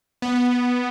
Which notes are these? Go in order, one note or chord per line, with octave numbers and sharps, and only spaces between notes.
B3